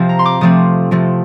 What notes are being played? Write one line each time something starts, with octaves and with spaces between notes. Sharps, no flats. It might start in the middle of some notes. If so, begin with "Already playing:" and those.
Already playing: C3 F3 C4
A#5
C6
D6
C3 F3 A3 C4 D#6
C3 F3 A3